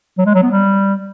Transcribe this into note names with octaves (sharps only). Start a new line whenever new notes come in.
F#3
G#3
F#3
B3
G3